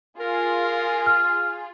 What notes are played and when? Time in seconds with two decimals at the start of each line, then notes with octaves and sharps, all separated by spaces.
0.20 F4 G#4 A#4
1.06 F6